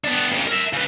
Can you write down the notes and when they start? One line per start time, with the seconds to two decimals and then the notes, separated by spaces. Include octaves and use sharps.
0.04 B3 D4
0.32 F2 C#3
0.47 A#4 E5
0.73 C#3 B4